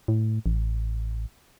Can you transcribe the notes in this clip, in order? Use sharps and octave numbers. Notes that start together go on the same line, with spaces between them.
A2
A1